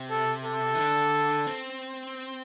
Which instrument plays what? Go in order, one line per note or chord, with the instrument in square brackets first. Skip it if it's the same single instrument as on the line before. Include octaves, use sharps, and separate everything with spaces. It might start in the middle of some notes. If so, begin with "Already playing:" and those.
Already playing: [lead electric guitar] C3
[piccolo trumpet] A4
A4
[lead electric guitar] E3
D3
C4